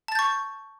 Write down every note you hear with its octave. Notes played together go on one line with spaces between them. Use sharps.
A5 C#6 G6 A6